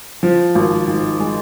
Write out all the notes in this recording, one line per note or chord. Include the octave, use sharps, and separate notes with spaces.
F3
G#1
G#2
G#3